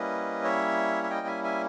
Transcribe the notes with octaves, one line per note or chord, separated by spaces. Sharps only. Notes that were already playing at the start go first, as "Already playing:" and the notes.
Already playing: G3 A#3 C#4 E4 B4 D#5
C#5 E5
E5
D#5 G5
E5 G#5
E5 G#5